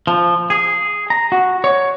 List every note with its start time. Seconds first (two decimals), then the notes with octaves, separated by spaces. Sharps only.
0.07 F3
0.50 G#4
1.10 A#5
1.32 F#4
1.64 C#5